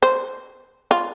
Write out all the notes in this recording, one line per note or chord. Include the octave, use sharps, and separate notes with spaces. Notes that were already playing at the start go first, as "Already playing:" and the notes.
C5
F4